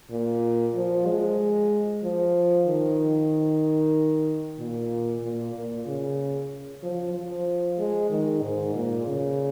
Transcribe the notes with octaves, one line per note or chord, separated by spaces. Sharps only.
A#2
F3
G#3
F3
D#3
A#2
A#2
A#2
C#3
F3
F3
G#3
D#3
G#2
A#2
C#3